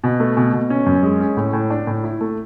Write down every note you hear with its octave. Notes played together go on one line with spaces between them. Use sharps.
B2
A3
B2
B2
C#4
F#2
G#3
C#4
A2
A2
D4
A2
E4
A3